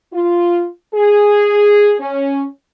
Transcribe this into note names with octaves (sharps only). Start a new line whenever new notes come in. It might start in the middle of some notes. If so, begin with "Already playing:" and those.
F4
G#4
C#4